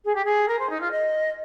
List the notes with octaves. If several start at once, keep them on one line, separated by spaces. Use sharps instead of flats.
G#4
G4
G#4
A#4
C5
D#4
F4
D#5